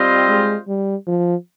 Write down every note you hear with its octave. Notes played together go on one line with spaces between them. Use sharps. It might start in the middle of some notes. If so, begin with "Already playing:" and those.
Already playing: G3 C4 F4 C5 D#5
G#3
G3
F3